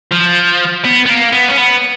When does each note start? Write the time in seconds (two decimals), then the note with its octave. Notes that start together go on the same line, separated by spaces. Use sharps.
0.12 F3
0.85 B3
1.06 B3
1.09 A#3
1.33 B3
1.49 C#4
1.58 B3